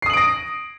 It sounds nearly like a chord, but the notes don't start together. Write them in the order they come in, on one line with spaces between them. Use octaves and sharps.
C7 D#6 F#7 D7 A#6